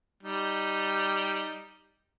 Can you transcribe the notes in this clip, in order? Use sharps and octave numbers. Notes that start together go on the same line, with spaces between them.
G3 D#4